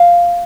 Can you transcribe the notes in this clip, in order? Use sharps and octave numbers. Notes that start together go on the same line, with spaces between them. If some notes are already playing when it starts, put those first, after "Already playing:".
Already playing: F5